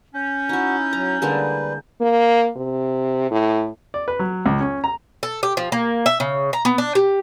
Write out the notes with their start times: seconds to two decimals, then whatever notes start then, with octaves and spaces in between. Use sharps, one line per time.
0.14 C#4 G6
0.49 D#4 E4 F#4
0.93 F#3 A#5
1.22 D3 G3 G#3 A#3 B4
2.01 A#3
2.56 C3
3.31 A2
3.94 D5
4.08 B4
4.19 F#3
4.46 C#2
4.60 C#4
4.84 A#5
5.23 A4
5.43 G4
5.57 F3
5.72 A#3
6.06 E5
6.20 C#3
6.53 A#5
6.65 B3
6.78 D4
6.95 G4